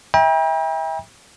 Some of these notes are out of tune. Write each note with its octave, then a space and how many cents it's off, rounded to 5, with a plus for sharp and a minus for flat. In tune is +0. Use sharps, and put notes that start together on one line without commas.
E5 -30 G5 +30 A#5 +45